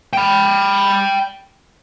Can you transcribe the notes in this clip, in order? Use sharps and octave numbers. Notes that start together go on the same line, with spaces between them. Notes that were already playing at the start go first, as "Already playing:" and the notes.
G5 B5